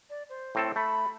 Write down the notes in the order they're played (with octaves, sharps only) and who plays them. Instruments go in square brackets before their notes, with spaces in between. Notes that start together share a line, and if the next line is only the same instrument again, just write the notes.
[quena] D5
C5
[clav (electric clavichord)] A2 C4 A4
[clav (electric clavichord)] A3 [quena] B5